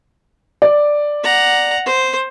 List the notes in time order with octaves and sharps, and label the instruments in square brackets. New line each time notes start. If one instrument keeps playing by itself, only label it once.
[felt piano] D5
[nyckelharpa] F#5 A#5
C5